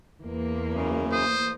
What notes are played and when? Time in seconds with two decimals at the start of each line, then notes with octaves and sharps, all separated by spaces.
0.24 E2 A#3
0.74 F#2 C#3
1.12 C5 D#6